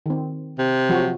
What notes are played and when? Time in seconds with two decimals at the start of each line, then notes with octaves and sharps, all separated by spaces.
0.06 D#3 C4
0.59 C3
0.89 F3 F#3 F#4